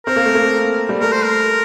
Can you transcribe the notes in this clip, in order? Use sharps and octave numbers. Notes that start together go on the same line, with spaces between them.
C4 A#4
A#3
A3
A#3
G3
A3 A#4
C5
A#4